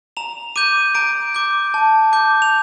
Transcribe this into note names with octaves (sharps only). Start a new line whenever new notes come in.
A#5 F7
D6 G6 D#7
A#5 D7
D6 G6
A5
D6 G6
F7